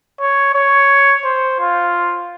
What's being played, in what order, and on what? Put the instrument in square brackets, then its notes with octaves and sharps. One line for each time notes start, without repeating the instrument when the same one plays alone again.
[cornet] C#5
C#5
C5
F4